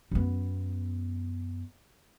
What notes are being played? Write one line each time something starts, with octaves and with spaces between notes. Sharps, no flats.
F#2 B3